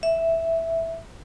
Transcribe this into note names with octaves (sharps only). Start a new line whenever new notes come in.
E5